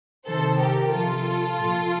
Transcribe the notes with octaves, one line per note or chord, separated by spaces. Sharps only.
C3 D#3 A4 C5
G4 A#4
C3 F3 F4 A4
A#2 F3